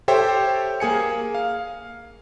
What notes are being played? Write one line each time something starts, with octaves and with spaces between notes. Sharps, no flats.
G4 A4 C5 C#5 E5 G5
A#3 G#4 G#5 C#7
F5